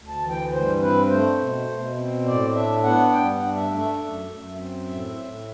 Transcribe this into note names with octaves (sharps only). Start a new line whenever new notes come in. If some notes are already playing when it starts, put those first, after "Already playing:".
Already playing: D2
A5
E3
G5
G2 C5
C4 B4
A3 C5
B2
B2
C4
A2 D5
D4 E5
B3 F#5
G2 G5
F#5
D4
E5
A3
E5
F#2
F#2
C4
A2 E5
A2